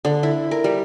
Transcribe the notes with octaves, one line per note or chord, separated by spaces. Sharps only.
D3
E4
A#4
G3